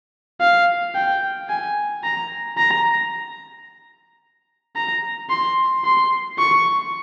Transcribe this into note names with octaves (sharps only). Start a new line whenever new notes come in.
F5
G5
G#5
A#5
A#5
A#5
C6
C6
C#6